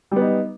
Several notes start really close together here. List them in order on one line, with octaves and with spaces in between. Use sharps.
G3 B3 D#4